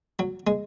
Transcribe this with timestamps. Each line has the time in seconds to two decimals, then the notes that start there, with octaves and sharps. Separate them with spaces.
0.19 F#3
0.47 G#3